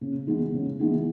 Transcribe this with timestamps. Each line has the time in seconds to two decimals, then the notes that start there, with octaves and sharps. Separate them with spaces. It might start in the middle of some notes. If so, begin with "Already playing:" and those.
0.01 C#3
0.27 E3 G#3 B3 E4
0.53 C#3
0.79 E3 G#3 B3 E4